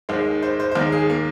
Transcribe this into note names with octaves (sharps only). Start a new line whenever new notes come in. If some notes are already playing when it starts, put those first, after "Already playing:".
D#2 D#3 G#3 C5
C5
C5
C5
D#2 D#3 G#3 A#4
G#4
A#3